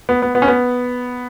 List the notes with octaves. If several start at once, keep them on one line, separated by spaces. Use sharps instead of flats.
B3
B3
B3
C#4
B3